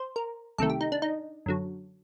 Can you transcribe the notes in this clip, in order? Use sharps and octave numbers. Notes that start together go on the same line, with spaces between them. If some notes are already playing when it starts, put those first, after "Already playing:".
Already playing: C5
A#4
C2 C3 D#3 A3 A4
G4
D#4
D4
D#4
F#2 D3 F#3